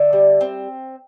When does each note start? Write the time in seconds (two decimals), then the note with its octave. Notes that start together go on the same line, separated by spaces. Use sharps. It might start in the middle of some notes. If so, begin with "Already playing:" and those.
Already playing: D3 E5
0.13 G3
0.41 C4